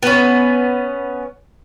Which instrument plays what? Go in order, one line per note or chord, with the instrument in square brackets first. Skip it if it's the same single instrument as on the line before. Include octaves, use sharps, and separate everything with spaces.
[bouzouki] B3 C#4